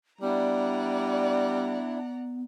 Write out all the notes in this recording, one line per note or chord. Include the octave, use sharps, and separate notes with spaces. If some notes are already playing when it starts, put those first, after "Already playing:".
G3 B3 D4 E4 D5 F#5 A#5